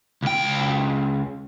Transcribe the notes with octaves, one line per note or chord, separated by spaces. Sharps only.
C#2 G5